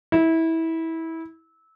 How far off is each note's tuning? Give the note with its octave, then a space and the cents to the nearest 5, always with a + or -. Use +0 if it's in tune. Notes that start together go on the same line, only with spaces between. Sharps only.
E4 -20